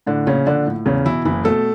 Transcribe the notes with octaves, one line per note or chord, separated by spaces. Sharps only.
A2 D3 D4
A#1 C#3 C#4
A#1 D3 D4
A2
E2 C#3 C#4
B2 E3 E4
F#1 E3 E4
B2 A3 A4